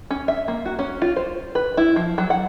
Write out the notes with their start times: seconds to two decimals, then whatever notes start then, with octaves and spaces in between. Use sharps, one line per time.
0.11 C#4
0.28 E5
0.48 A#3
0.65 F#4
0.79 C#4
1.02 F4
1.16 C5
1.55 B4
1.77 E4
1.96 F3
2.18 F#3
2.30 F#5